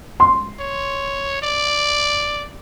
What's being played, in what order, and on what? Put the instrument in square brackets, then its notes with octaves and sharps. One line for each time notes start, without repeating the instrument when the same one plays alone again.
[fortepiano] C6
[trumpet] C#5
D5